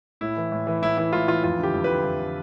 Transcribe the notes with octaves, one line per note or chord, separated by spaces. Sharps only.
A2 E4
E3
A2
E3
A2 E4
E3 E4
A2 F4
E3 F4
F2 F4
D3 G4
F2
B4
D3
F2
D3